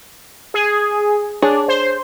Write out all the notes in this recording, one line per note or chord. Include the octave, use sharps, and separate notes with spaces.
G#4
D4 G#4 C#5
C5